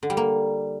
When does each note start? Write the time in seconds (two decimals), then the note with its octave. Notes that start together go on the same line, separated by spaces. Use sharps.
0.03 D3
0.10 G3
0.17 A#3